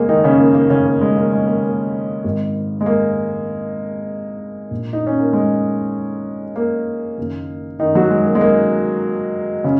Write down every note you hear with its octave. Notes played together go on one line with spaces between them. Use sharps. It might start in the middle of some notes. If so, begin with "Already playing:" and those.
Already playing: D#2 C#3 G#3 A#3 G#4
D#3 D#4
C#3 C#4
A#3
A#3
C#3 C#4
A#3
G#3
A#3
G#3
A#3
A#3
G#1 G#2 D#3
G#3
A#3
A#1 A#2
D#4
C#4
A#3
G#3
A#3
F#1 F#2 D#3
D#3 D#4
F#3 F#4
G#3
A#3
G#3
A#3
C#3 C#4